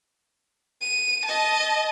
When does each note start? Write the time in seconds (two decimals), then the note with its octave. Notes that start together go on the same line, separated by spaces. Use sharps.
0.82 D#7
1.26 D#5 A5